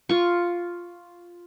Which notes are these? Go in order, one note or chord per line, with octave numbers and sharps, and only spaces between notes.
F4 C#6